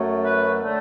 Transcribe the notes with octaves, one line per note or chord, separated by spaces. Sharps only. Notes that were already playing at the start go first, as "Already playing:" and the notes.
Already playing: F#2 F#3 A3
B4
D3 A3